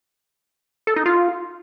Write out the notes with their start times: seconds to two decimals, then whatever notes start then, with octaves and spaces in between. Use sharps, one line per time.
0.87 A4
0.96 D#4
1.06 F4